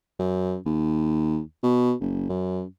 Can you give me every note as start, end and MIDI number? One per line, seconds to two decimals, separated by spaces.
0.19 0.57 42
0.66 1.40 39
1.63 1.93 47
2.00 2.25 30
2.29 2.64 42